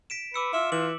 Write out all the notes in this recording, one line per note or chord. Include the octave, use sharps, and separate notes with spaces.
B6 D7 E7
B4 D6 E6 C#7
F4 E5
E3 D6 F#7